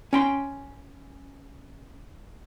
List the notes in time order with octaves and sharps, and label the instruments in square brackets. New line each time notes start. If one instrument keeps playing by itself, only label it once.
[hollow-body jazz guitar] C#4 G5 C6